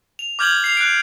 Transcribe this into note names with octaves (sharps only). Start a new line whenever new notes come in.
F7
D6 F6 G6 G#6 F7 F#7
C7 F7
F#6 D7